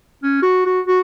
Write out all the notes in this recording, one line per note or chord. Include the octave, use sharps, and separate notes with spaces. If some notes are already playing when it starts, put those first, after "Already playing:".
C#4
F#4
F#4
F#4